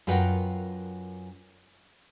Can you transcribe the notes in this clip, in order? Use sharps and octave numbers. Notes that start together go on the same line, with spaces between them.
F#2 F4 A#4 B4 F#5 G5